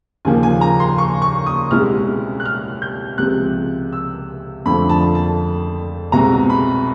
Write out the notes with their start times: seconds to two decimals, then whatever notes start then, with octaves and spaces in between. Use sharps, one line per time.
0.25 D#2 C#3 F3 A#3 G#5
0.43 G#5
0.61 A#5
0.80 C6
0.98 C#6
1.22 C#6
1.46 D#6
1.71 C2 B2 G#3 C#4 E4 F6
2.40 F#6
2.45 F6
2.82 G6
3.18 C#2 C3 F3 G#3 C4 F#6
3.93 E6
4.66 F2 D3 F3 A3 C4 B5
4.89 A5
5.15 A5
6.12 C2 B2 G#3 C4 A#5
6.50 B5